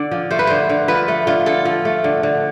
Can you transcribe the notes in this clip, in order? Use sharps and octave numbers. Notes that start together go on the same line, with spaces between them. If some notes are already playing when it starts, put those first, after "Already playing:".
Already playing: D3 D5
F3
A3 C5
B4
D3 C5
D3
F3 B4
A3
D3 F4
D3 A4
F3
A3
D3
D3